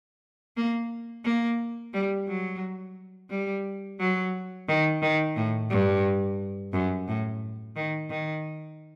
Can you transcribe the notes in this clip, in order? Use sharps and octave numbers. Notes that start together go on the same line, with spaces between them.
A#3
A#3
G3
F#3
G3
F#3
D#3
D#3
A2
G2
F#2
A2
D#3
D#3